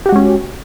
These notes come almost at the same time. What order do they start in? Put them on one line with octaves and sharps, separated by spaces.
G4 F#4 G#3 C#4